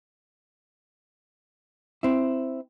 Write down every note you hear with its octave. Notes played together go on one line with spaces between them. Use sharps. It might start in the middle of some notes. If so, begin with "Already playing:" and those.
C4 E4